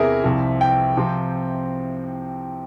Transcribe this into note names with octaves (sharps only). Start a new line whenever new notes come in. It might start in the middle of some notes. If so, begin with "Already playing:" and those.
Already playing: E2 C3 E3 G#4 A#4 E5
C2 C3 F3
G5
C3 F3 C4